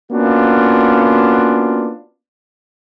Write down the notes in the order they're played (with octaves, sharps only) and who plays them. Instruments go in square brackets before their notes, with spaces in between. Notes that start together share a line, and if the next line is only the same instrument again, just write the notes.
[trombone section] A#3 B3 C#4 D4 F4 F#4